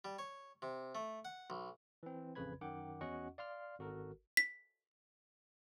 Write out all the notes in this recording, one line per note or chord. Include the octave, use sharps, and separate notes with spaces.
G3
C#5
C3
A3
F#5
B1
E3 C4
A1 F2 C#3 B4 B5 G#6
F#2 D#3 F#5 G5 D6
E2 C#4 F#4 D#5 F#5 C#6
D5 F5 C6 F6
G#1 F#4 A4 A#4
B6